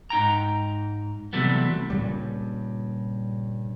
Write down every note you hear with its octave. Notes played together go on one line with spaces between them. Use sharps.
G#2 D#4 G5 A#5
C3 E3 F#3 G3 A3 B3
G2 A#2 C#3 G3